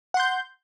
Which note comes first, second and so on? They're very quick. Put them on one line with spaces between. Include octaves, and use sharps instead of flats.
F#5 C6 G6